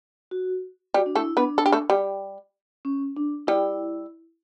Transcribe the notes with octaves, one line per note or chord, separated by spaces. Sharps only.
F#4
G3 F#4 G4
D4
A3 E4 A4
B3 D4 B4
A4
G4
A3 A4
G3 G4
C#4
D4
G3 E4 G4